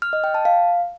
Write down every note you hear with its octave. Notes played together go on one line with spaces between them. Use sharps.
F6
D#5
G5
A5
F5